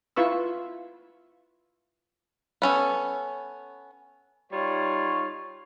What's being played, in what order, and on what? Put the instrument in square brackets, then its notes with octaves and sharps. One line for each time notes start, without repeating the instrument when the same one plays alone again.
[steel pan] E4 F4 B4 C#6 E6
[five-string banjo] B3 C#4 A4
[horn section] G3 D#4 F4 C#5